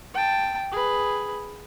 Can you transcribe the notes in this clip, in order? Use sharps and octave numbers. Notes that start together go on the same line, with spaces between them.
G5 A5
G#4 B4